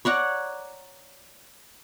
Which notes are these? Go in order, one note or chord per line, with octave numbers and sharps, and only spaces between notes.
C#5 D5 F#5 A#5